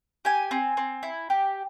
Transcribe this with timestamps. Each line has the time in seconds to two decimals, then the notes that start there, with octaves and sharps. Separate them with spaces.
0.25 G4 G#5
0.51 C4
0.77 C4
1.03 E4
1.30 G4